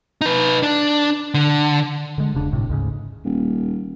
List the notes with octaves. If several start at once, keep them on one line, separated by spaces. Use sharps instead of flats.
D#4 B4
D4
D3
D3 G#3
E1 C#3 D4
G1 A2 C3
D2 G#2 C#3
D#1